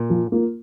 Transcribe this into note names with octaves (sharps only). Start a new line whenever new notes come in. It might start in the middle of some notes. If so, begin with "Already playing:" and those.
Already playing: A#2
F3
A#3 F4